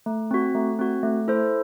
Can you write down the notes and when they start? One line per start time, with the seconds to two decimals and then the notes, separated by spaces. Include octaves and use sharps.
0.06 A3
0.31 C4 F#4
0.55 A3
0.79 C4 F#4
1.03 A3
1.28 E4 A4 C5